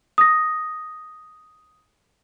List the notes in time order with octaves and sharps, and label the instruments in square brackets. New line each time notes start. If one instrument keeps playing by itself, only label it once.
[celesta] D#6 A#6